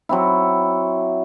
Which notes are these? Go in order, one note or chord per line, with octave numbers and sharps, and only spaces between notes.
F#3 C4 E4